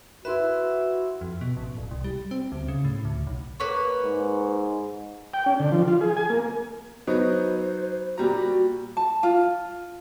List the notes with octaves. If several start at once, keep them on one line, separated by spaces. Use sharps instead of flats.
E4 F#4 B4 E5 C6 E6
F2
B2
A1
D1
C2
G3
C4
D2
C#3
A2
D2
B1
A#3 B4 C#5
G#2
G5
C#4
D3
F3
F4
G#4
G#5
A#3
F#3 B3 D#4 C5
A#2 G3 F#4 A#5
A5
F4